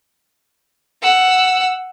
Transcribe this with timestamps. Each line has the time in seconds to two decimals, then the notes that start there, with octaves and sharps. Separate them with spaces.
1.02 F#5 E6